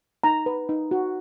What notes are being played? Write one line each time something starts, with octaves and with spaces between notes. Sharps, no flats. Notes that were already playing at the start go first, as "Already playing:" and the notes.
D#4 A#5
B4
D#4
F#4